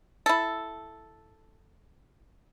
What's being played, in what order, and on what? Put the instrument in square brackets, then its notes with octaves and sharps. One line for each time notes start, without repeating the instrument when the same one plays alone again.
[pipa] E4 A4